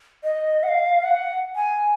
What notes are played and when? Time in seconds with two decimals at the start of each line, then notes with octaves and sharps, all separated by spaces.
0.24 D#5
0.63 F#5
0.68 F5
1.03 F#5
1.55 G#5